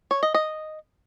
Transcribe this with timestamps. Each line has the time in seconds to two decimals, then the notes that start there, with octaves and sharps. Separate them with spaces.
0.11 C#5
0.23 D#5
0.34 D#5